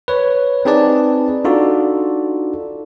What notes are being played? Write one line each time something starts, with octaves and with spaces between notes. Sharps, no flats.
B4 C#5
C4 D#4 G#4 B4 D5 A5
D4 D#4 F4 F#4 A4 D5